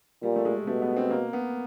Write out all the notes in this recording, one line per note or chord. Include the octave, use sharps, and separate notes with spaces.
A#2 G3
A3
G#3
B2 A3
B3
C4
A#3
B3